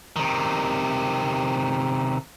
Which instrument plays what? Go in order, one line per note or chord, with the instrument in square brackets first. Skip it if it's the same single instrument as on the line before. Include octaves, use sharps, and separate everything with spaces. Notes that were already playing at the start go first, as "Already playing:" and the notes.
[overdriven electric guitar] C3 D#3